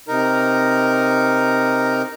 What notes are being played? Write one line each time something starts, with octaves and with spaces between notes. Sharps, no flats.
C3 D#4 A#4 A#5